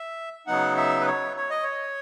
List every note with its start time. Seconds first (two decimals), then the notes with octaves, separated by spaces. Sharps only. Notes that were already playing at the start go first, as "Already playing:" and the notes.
Already playing: E5
0.47 C#3 F#3 B3 D#4 F#5
0.77 E5
1.01 B4
1.07 C#5
1.37 C#5
1.50 D#5
1.64 C#5